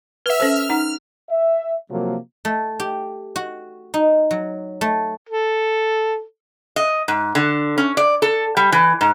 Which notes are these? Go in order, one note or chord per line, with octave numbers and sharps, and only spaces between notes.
B4 E5 F#5 F6
C#4 A4 C5
F6
D#4 F#5 A#5
E5
C3 F3 F#3 A#3
A3
G4
F#4
D#4
F#3
A3
A4
D#5
G#2
D3
C#4
D5
A4
G3
E3
G#2